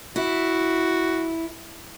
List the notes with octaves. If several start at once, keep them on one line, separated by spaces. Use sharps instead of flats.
E4 F#4